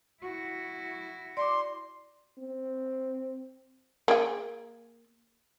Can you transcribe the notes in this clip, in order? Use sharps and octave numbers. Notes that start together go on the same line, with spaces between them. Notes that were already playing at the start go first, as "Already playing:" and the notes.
E4 F#4
D5 C6 D6
C4
A#3 G#4 G5